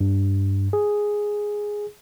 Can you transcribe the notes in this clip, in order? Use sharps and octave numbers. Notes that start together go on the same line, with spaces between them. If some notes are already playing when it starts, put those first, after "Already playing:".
G2
G#4